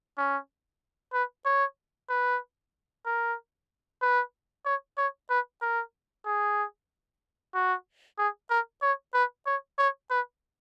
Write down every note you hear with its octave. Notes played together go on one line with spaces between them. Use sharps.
C#4
B4
C#5
B4
A#4
B4
C#5
C#5
B4
A#4
G#4
F#4
G#4
A#4
C#5
B4
C#5
C#5
B4